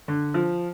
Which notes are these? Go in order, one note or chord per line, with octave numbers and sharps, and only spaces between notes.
D3
F3